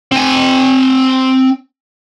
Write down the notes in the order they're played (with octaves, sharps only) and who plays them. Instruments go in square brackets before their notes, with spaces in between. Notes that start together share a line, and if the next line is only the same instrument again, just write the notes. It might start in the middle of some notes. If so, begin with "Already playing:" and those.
[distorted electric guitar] C4 G#5